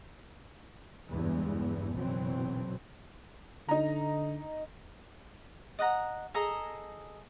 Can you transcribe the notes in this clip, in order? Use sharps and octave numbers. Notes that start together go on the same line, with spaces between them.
F#1 E2 G2 E3 G#3
F#1 F#2 B2 E3 F#3 C4
D3 D#4 A#5
D#5 F#5 A#5
G#4 A4 D#5 A#5